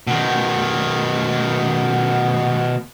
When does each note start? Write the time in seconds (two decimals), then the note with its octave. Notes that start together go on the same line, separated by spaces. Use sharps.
0.07 B2 D#3